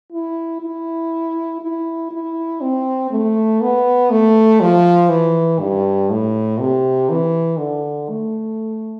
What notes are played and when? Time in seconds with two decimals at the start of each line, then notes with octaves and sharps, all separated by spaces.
0.12 E4
0.61 E4
1.61 E4
2.11 E4
2.61 C4
3.11 A3
3.61 B3
4.10 A3
4.61 F3
5.09 E3
5.59 G2
6.10 A2
6.60 C3
7.09 E3
7.58 D3
8.09 A3